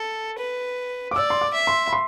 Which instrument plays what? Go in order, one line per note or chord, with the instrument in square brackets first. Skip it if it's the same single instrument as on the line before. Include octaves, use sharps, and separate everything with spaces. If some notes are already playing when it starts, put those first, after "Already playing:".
Already playing: [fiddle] A4
B4
[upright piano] D6
[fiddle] D5 [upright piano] E6
[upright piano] C6
D6
[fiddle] E5
[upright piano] C6
B5
C6